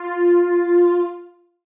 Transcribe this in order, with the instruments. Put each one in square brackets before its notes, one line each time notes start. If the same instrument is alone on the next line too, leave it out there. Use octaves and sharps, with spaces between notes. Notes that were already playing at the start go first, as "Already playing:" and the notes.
Already playing: [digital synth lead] F4